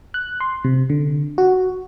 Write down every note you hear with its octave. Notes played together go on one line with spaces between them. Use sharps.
F#6
C6
C3
D3
F#4